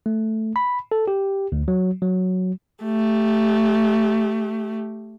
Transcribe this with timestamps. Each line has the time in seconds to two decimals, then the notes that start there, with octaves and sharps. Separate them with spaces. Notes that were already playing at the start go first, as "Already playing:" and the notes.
0.06 A3
0.56 B5
0.92 A4
1.08 G4
1.52 D2
1.68 F#3
2.02 F#3
2.84 A3 G4